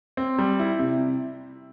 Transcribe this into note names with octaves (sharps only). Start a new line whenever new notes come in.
C4
G3
E4
C3